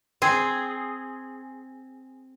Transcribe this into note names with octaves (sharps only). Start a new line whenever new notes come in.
C4 G#4